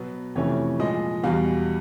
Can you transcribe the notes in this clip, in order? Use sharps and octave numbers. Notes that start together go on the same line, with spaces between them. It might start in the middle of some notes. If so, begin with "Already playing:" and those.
Already playing: B2 F#3 B3
F2 C3 E3 A3 C#4 C#5
A#2 F3 G#3 D#5
E2 B2 G3 F5